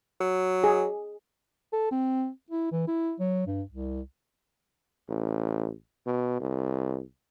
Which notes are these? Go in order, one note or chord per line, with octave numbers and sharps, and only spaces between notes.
F#3
G#4
A4
C4
E4
E3
E4
F#3
G2
C2
A1
B2
C2